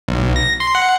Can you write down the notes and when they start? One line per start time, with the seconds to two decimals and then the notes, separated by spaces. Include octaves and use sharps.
0.08 B1
0.36 A#6
0.60 C6
0.75 F#5